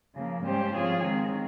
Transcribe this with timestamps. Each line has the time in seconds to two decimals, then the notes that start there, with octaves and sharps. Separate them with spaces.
0.13 C#3 F3 A#3
0.43 G#2 G3 C#4 G4 C5
0.73 F3 C4 F4 G#4 C#5
1.01 D#3 G#3 C4